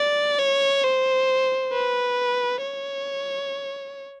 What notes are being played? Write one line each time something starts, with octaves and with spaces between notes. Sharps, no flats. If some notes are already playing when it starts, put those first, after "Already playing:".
Already playing: D5
C#5
C5
B4
C#5